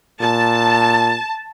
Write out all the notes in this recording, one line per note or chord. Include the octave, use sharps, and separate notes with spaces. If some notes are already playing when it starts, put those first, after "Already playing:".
A#2 A5